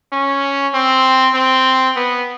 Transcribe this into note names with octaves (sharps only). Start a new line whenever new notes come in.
C#4
C4
C4
B3